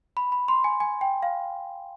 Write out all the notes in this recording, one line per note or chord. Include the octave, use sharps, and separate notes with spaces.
B5
B5
C6
G#5
G#5
G5
F5